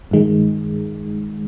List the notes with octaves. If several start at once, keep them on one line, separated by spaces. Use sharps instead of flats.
G2 D#3 G#3